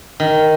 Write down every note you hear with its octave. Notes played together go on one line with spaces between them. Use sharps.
D#3